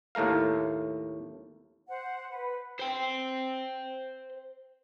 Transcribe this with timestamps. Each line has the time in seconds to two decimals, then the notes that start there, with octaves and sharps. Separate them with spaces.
0.15 D#2 A2 A3 A#4 F5
1.88 C5 F#5
2.31 B4
2.80 C5 G5